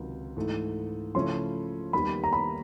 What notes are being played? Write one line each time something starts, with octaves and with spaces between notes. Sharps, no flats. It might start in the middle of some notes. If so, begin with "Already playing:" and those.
Already playing: C#2 C3 D#3 F#3
G#2 E3 A3
C#3 F3 A3 C#4 E4 C6
D#2 D#3 G3 B3 B5
A#5
B5